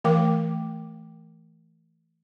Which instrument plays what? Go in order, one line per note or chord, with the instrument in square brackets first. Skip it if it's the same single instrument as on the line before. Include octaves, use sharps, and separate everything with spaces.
[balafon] E3 A3 A#4 F5 G5 D6